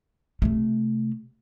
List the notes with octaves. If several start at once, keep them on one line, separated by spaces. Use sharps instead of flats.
C3 A3